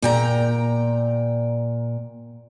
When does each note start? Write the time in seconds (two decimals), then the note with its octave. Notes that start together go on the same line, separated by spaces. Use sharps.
0.02 A#2 G5 A#5